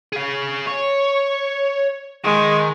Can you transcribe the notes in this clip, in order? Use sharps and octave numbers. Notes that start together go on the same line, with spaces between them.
G#4 F5
C#5
D#3 G#3